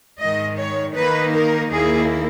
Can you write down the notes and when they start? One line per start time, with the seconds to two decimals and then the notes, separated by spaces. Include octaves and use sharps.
0.19 G#2 D#3 G#3 D#5
0.57 C#5
0.95 D#3 A#3 D#4 B4
1.34 A#4
1.71 D#2 D#3 A#3 E4 G#4